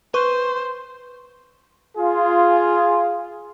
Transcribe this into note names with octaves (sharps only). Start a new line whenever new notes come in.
B4 C5 C#6
F4 G#4